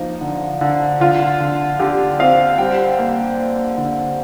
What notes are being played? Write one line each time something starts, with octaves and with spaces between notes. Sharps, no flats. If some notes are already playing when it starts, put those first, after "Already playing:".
Already playing: F3 A#3 D#4
D3
D3
D3 F4
D3
D3 G4
C4 F5
G3 G5
A#3
A#3
D3